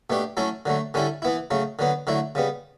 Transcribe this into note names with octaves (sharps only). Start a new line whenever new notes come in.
B2 A3 D4 G4
F#3 A3 C#4 E4 A4
D3 F#3 A3
D3 G3 C#4 E4 A4
E3 B3 E4
C#3 F#3 A3
D3 F#3 B3
D3 F#3 A3 E4
C#3 G3 B3